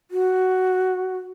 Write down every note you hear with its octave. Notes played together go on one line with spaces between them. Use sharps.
F#4